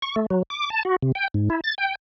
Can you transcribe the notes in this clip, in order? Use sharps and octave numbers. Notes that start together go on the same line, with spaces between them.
C#6
A3
F#3
D6
A5
F#4
C3
G5
G#2
E4
A6
G5